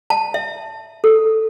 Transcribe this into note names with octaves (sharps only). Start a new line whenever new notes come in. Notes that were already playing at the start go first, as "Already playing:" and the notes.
A5
E5
A4